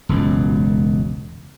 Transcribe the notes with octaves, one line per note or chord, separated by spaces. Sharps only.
E1 C#2 F#2